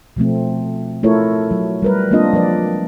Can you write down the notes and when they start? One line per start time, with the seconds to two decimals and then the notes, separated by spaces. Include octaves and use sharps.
0.16 B2 F3 A3 C4
1.03 A3 E4 F4 A4 A#4 C#5
1.51 F#3
1.82 G3 A#4 B4
2.11 G#3 A#3 C4 D4 F4 D#5
2.33 F3 F#3 B4 D5